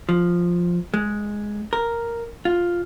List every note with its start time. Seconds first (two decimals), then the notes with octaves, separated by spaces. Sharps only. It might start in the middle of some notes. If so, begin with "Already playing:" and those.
0.09 F3
0.94 G#3
1.73 A#4
2.45 F4